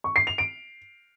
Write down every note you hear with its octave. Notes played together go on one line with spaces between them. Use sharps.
C#6
C7
F7
D7